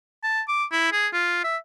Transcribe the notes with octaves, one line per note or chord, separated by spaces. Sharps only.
A5
D6
E4
G#4
F4
E5